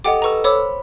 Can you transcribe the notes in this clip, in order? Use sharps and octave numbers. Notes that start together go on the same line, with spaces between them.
G4 A4 D#5 F#5 G5 D6
A4 B4 A#5 C#6 E6
C5 C#5 B5 D6 E6